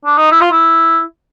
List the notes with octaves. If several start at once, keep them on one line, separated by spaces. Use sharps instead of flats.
D4
D#4
E4
F4
E4